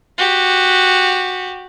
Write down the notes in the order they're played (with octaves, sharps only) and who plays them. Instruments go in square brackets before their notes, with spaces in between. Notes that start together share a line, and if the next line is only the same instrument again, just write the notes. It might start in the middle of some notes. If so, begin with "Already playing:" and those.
[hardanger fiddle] F#4 G4